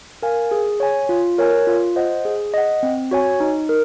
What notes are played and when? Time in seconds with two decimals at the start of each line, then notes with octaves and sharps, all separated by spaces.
0.22 A#4 F5 G#5
0.51 G#4
0.80 C#5 G#5
1.09 F4
1.38 A#4 C#5 G#5
1.67 F4
1.96 C5 D#5 F#5
2.25 G#4
2.54 D#5 F#5
2.83 C4
3.11 F#4 C#5 G#5
3.40 D#4
3.69 A#4